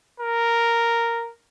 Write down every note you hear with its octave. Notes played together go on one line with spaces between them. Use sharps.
A#4